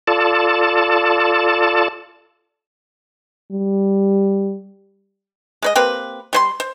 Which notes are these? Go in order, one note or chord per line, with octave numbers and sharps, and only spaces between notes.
F4 A4 D5 A5
G3
G#3 B4 D#5
A#3 C4 G4 B4
G3 C5 C6
C5